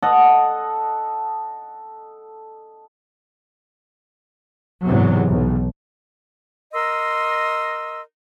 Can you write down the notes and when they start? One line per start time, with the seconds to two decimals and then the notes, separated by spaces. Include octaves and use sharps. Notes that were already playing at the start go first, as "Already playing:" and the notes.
0.02 A4 D#5 F#5
4.84 E2 G#2 C3 F#3
5.28 B1
6.73 A#4 D#5 C6 E6